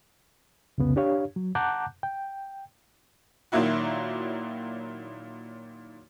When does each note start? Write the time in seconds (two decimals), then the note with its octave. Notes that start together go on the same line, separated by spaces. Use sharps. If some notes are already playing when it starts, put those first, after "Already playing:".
0.78 C2 F2 C#3 B3
0.96 D4 G4 C#5 F5
1.36 F#3
1.55 F#5 A5 A#5 D6 F#6 G6
2.03 G5
3.52 A#2 D#3 F#3 A#3 E4 F#4